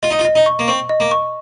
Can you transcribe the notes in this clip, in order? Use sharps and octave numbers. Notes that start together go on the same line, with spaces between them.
F4 D#5
D#4
F4
D#5
D#4
C#6
A#3
C4 C#6
D#5
A#3
C#6